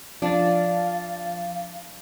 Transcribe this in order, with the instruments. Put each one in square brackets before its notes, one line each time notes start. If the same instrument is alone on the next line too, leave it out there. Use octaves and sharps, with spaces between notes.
[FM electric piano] F3 A6 [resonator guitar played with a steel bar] D4 [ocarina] F5